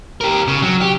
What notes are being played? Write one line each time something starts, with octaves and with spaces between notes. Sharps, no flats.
G4 A#4
C#3
F#3
G4